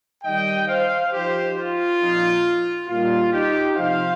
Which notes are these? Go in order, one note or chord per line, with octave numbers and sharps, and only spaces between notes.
D#3 G3 D#4 D#5 G5
C5 F5
F3 D#4 G4 C5
F4
A#2 F3 C4 D#4
A#2 G3 A#3 D#4 F4
D#4 G4
C3 F3 D#4 C5 F5